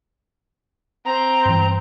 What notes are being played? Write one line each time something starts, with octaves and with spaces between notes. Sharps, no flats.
C4 A#5
G2 E3